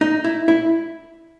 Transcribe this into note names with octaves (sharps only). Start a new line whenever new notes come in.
D#4
E4
E4